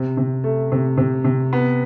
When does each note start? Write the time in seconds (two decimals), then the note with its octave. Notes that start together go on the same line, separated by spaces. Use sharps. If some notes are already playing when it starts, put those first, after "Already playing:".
Already playing: C3
0.17 C3
0.44 A3
0.72 C3
0.98 C3
1.25 C3
1.53 B3